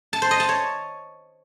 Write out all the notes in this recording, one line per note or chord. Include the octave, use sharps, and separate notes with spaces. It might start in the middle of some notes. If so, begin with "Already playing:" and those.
A5
C5
D#5
A5
C#5